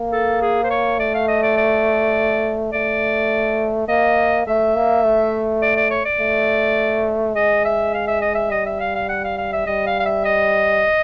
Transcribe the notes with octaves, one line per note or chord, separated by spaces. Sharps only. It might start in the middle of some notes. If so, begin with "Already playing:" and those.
Already playing: A#3
A4
G#4
C5
C#5
A3 D5
F5
D#5
D5
D5
A3 D5
A#3 D#5
A3 E5
A#3
A3
D5
D5
C#5
D5
A3
G#3 D#5
E5
F5
E5
D#5
E5
G3 D#5
E5
F5
F5
F#5
F5
F5
E5
G3 D#5
F5
F5
E5
D#5